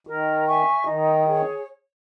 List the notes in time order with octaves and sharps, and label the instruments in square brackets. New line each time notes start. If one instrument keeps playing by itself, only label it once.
[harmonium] D#3 [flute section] A#4
[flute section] E5 G#5 C#6
[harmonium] D#3 [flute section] D#4
[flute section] G#4 C#5